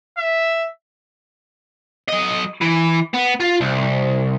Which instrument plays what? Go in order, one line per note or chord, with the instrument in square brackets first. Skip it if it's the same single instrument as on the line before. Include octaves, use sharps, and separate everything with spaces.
[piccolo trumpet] E5
[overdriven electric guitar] F#3 D#5
E3
B3
F4
C2